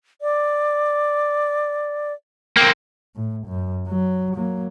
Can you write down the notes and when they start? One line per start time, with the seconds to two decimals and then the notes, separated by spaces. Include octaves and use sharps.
0.22 D5
2.57 A#3 C4 G5
3.15 A2
3.47 F#2
3.88 F#3
4.36 F#3 A#3